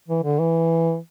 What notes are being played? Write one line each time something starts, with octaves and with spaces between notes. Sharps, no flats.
E3
D3
E3